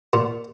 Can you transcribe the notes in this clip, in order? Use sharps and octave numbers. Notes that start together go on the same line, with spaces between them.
A#2